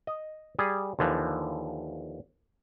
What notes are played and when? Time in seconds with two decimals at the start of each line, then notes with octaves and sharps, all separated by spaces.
0.07 D#5
0.59 G3 G#4
0.99 D#2 D3 E3 F3